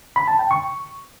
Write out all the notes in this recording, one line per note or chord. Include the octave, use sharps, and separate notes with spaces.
B5
A5
G5
C#6